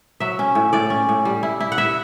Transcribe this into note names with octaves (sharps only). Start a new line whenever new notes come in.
F#3 E5
C#4
A2
A2 D5
C#4
A2
G3
E4
E4
F#5
E4 E5